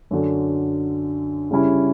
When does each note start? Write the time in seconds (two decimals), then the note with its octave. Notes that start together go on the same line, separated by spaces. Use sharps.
0.11 F#2 D3 F#3
1.51 C#3 G3 C#4 E4